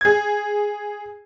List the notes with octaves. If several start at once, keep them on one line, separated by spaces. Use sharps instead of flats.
G#4 G#6